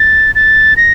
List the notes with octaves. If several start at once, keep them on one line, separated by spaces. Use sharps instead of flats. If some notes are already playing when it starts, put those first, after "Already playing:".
Already playing: A6
A6
A#6